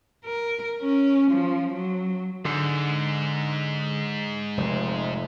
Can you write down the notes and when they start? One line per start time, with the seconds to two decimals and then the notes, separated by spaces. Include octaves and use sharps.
0.25 A#4
0.82 C#4
1.32 F3
1.74 F#3
2.45 G#2 D3
4.57 F1 F2